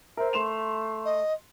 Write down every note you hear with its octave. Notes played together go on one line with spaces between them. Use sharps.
A#4 C5 E5
A3 C6 E7 F7
D#5